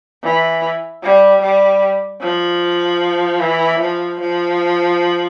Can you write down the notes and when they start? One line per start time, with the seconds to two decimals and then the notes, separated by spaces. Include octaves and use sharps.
0.23 E3
1.03 G3
1.42 G3
2.22 F3
3.40 E3
3.80 F3
4.20 F3